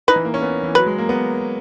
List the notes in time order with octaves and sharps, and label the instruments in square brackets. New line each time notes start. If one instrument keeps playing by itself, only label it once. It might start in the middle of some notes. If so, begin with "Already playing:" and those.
[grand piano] D#4 [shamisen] B4
[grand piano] E3
A#3
C#4
B3
E3
[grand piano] F#3 [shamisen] B4
[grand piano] G#3
A#3
B3